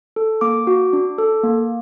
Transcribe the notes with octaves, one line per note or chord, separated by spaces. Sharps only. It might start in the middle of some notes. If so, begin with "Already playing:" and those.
A4
A#3 D6
F#4
D4
A4
A#3